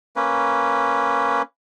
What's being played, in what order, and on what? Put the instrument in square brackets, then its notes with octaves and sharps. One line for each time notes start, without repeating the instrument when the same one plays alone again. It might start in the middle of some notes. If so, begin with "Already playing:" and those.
[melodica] A#3 C#4 B4